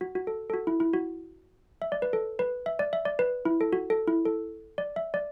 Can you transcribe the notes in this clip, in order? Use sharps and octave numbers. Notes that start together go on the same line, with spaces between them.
F#4
F#4
A4
A4
F#4
E4
E4
F#4
E5
D5
B4
A4
B4
E5
D5
E5
D5
B4
E4
A4
F#4
A4
E4
A4
D5
E5
D5